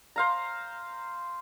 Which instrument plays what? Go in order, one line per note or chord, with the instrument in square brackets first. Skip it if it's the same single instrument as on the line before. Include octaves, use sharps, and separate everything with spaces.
[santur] C5 F5 A#5